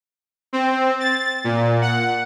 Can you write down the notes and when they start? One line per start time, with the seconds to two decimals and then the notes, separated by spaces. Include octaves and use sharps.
0.53 C4
1.00 A6
1.44 A#2
1.82 F#5